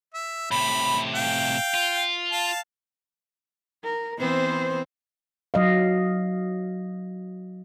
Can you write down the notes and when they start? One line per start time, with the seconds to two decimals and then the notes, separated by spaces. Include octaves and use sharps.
0.14 E5
0.51 A2 C3 B5
1.15 F5 G5
1.74 F4
2.32 F5 A5
3.83 A#4
4.19 E3 B3 C4 C5
5.54 F#3 D#5 F5